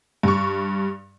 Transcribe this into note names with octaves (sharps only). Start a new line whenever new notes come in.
G2 C#6